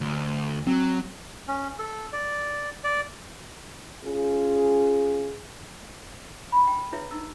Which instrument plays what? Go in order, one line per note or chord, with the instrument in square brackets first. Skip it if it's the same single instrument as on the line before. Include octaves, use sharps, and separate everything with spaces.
[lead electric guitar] D2
[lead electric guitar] F#3 [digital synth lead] C4
[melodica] C#4
A4
D5
D5
[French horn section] C#4 F4 G#4
[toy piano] B5
G5
E4 G#4 B4 C#5 E5
D#4 E4 E6